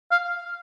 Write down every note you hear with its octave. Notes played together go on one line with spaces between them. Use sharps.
F5